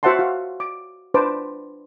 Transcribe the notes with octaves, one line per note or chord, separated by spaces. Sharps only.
F#4 C5 E5 F#5 A5 C6
F#4 F5
D6
D4 B4 C5 A5 D6